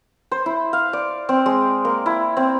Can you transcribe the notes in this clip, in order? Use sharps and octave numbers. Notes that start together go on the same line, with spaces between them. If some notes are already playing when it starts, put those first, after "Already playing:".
C5
E4
F5
D5
C4
G#3
A#3
E4
C4